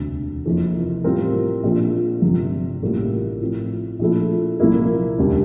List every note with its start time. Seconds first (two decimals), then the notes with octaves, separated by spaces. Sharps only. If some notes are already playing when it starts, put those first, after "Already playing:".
Already playing: E1 D2 C3
0.45 F1 F2 E3 A#3
1.04 A2 G3 C4 F4 A#4
1.63 A#1 A#2 F3
2.22 G1 F2 C3
2.82 A1 A2 G3 A#3 F4
3.41 A2 F3 C4
3.99 A#1 A#2 F3 A3 E4
4.60 C2 A#2 F3 A#3 E4
5.18 E1 D2 C3 G3 D4